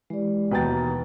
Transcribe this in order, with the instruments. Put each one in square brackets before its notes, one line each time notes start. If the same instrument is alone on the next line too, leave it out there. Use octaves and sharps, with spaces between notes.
[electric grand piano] E3 [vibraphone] G#3 G4 D5
[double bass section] D#2 E3 [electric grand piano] B2 [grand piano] B4 G5 A6 [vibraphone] G#5 A#5